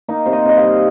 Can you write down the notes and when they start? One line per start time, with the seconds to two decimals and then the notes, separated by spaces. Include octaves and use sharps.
0.08 A#3 D#4
0.26 C3 C5
0.33 D#5
0.45 C3 D#5
0.57 F5
0.63 G3